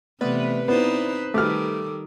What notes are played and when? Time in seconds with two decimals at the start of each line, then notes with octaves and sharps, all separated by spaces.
0.21 C3 E3 A3 B3 B4 D5
0.68 B3 C4 D#4 E4 C5 D5
1.34 D#3 G3 A3 A4 D6 F6